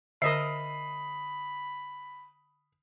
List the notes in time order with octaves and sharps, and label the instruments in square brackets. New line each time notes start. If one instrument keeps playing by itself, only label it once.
[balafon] D3 [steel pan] A#4 D#5 E5 [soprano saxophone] B5 [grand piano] D#6 C7